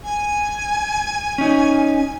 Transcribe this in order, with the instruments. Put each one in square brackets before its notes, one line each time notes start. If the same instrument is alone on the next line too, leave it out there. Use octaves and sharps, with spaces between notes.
[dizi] G#5
[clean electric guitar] C#4 D#4